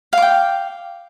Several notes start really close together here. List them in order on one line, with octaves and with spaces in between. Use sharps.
F5 D6 G5